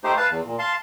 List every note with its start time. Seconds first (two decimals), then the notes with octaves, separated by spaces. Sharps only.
0.04 A3 D#4 G4 C5
0.17 B4 F5 A5
0.30 E2
0.46 A#2
0.59 F5 A5 C6